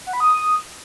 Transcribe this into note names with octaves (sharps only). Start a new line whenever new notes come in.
F#5
B5
D#6